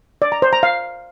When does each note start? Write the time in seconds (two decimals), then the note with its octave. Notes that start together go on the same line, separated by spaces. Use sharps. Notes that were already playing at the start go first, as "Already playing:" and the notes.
0.22 D5
0.32 A#5
0.42 C5
0.53 A#5
0.63 F5